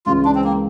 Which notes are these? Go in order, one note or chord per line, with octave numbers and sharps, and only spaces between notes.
C#2 C#3 E3 G#3 F4
D4
C4
A#3